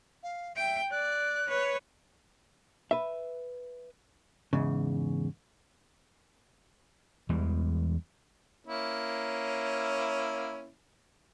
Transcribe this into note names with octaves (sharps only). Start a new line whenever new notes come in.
F5
E5 G5
D5 F#6
B4 C#5
B4 E5
E2 G#2 C#3
E2 E3 G3 G#3
A#3 C#4 E4